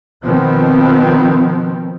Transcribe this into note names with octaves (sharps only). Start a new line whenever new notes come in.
B2 D#3 F3 B3 C4